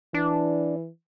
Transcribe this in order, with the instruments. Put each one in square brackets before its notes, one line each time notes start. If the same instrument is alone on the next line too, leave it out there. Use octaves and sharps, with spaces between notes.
[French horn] E3 [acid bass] D4